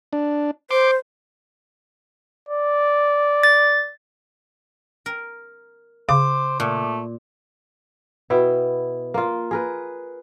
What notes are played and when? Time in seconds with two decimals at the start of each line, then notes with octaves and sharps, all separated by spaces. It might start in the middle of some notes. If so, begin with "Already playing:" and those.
0.13 D4
0.71 C5 C6 D6
2.49 D5
3.43 A6
5.06 A#4
6.09 C#3 C5 D6
6.60 A#2 A3
8.30 B2 B3 E4 G5
9.14 A#3 F4
9.51 G#4 A#4 B4